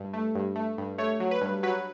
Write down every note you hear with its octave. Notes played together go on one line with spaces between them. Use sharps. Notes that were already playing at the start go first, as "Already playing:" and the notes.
Already playing: G2
A3
G2
A3
G2
A3 C#5
F#3
B4
G2
F#3 B4